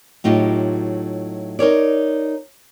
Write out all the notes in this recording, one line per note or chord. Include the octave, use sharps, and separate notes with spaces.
A2 F#3 D#4 F4 G4
D#4 A#4 C#5 D5